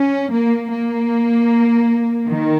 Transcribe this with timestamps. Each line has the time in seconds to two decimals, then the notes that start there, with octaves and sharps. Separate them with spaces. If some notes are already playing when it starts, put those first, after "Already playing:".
Already playing: C#4
0.33 A#3
0.71 A#3
2.28 D#3